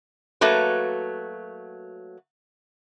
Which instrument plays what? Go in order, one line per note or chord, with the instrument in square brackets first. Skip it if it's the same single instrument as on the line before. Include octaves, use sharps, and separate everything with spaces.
[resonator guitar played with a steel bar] F#3 A3 A#3 F#4 B4